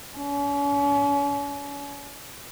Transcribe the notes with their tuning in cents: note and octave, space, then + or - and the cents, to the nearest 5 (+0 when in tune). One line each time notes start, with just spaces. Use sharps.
C#4 +40